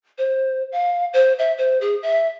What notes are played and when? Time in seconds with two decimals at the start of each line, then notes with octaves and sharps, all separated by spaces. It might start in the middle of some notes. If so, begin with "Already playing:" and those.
0.18 C5
0.72 F5
1.14 C5
1.39 E5
1.58 C5
1.81 G#4
2.03 E5